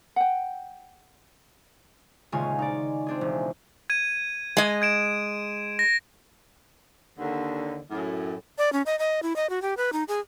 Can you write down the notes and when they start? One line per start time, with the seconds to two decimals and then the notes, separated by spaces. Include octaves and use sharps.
0.16 F#5 G5
2.32 D#1 C#3 G#3 C#4 F4 G#5
2.59 D#4 D5
3.07 C4 D4 G#4
3.21 E1
3.90 G#6 D#7
4.57 G#3 D#5
4.82 G#6 D7 E7
5.79 A#6
7.18 D#2 D3
7.91 F#2 A2
8.58 D5
8.73 C#4
8.86 D#5
8.99 D#5
9.23 E4
9.36 D#5
9.50 F#4
9.62 G4
9.77 B4
9.93 D#4
10.08 G#4